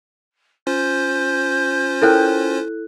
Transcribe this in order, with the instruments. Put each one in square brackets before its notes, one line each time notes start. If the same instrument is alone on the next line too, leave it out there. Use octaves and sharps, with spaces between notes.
[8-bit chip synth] C#4 F4 C5 [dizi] G6
[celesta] E4 A4 F#6 [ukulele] A#4 C#5 G5